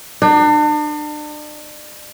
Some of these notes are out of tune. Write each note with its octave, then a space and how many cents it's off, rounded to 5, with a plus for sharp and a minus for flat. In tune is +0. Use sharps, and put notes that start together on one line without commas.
D4 +40